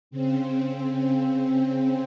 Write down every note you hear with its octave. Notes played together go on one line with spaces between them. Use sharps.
C#3 C4